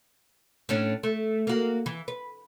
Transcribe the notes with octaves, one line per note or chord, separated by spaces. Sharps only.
A2 C#4 D4
A3
A#3 F#4
E3
B4